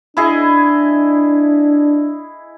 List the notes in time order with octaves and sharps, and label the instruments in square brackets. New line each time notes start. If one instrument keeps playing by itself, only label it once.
[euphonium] D4 [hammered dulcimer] E4 G#4 D#5